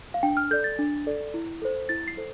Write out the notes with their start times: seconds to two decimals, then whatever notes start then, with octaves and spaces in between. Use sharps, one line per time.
0.14 F5
0.23 D4 G5
0.37 F6
0.51 A4 D5 G6
0.64 A6
0.79 D4
1.07 A4 D5
1.34 E4
1.62 A4 C5
1.89 E4 A6
2.08 C7
2.17 A4 C5